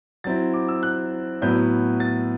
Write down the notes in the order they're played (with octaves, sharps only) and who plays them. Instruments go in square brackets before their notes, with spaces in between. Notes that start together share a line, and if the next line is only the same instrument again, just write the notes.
[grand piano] F#3 C4 E4 A6
D6
E6
F#6
A2 F#3 B3 E4 G6
A6